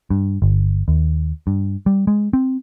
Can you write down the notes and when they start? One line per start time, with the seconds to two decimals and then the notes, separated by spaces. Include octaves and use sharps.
0.10 G2
0.42 G1
0.88 D#2
1.47 G2
1.86 G3
2.07 G#3
2.33 C4